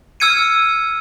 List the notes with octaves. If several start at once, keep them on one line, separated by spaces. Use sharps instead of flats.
E6 F6 G#6 C#7 D#7